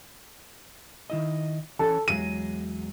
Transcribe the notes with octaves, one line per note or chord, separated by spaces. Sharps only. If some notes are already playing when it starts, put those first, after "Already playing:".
D#3 E4 D#5
E3 C#4 A4
E2 F#3 G#3 D#7